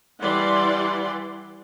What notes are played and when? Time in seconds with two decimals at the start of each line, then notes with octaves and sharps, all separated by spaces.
0.22 E3 G3 E4 D5 F#5 C6